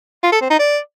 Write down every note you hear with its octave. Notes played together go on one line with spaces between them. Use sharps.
F4
A4
C4
D#4
D5